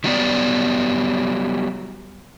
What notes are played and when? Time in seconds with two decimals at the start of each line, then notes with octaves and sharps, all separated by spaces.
0.04 D#3 F#3 G3 B3 D5